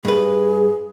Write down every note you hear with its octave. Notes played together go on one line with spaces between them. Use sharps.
G2 G#4 B4